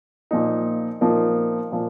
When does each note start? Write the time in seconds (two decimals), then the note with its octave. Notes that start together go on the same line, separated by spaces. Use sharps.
0.31 A#2 F3 A#3 D#4
1.01 A#2 F3 A#3 D#4
1.72 A#2 F3 A#3